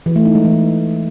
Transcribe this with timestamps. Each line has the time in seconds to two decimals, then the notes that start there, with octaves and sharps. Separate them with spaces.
0.06 E3
0.16 A3
0.25 D#4
0.35 G#3
0.45 E3